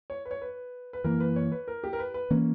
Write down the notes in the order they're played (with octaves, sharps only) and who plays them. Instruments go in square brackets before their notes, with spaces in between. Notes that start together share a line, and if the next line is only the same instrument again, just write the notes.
[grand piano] C#5
B4
C#5
B4
B4
[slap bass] F#2 E3 A#3 [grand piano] A#4
[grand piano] B4
C#5
B4
A#4
G4
A#4
B4
B4
[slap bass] E3 A#3 C#4